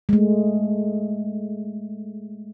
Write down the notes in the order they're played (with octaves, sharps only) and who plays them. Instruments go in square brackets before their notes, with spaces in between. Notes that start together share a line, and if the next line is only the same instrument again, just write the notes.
[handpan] G#3 A3